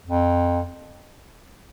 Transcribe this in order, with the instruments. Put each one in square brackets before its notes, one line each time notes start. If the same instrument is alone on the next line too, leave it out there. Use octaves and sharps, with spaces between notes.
[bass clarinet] F2